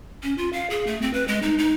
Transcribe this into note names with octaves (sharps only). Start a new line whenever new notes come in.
C#4
F4
F5
G#4
A3
C4
B4
G#3
D#4
D#4